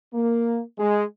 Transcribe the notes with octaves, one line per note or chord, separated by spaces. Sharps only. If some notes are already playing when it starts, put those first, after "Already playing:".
A#3
G#3